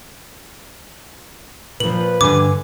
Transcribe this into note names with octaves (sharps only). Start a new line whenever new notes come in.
A#2 F3 B4 F#7
G2 D3 G#5 D6